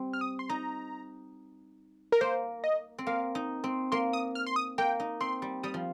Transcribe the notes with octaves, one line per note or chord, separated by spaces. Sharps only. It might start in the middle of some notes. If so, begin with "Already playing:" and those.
Already playing: G3 C4
F6
D#6
C6
D#4 A#5
A#4
A#3 C5
D#5
C4
A#3 F5
D#4
C4
A#3 C6
D#6
F6
C6
D#6
A#3 G5
D#4
C4 C6
G3
G3 D#6
F3